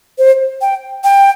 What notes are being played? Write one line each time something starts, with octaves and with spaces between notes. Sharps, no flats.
C5
G5
G5